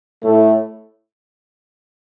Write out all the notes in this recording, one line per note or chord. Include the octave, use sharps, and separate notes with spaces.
A2 A3